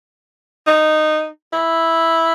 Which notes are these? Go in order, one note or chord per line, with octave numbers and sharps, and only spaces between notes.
D#4
E4